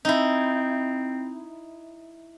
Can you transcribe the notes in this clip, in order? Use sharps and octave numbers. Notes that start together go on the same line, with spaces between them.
C4 D#4 E4